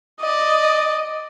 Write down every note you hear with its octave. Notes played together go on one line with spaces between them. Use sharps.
D5 D#5